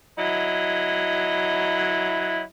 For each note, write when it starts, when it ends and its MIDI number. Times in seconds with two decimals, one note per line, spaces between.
0.19 2.42 54
0.19 2.42 64
0.19 2.42 75